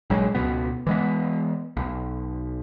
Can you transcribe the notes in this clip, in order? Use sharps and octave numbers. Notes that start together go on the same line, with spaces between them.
A#1 F#3 G#3
C#2 G#2 B2 B3
E3 G#3 B3
B1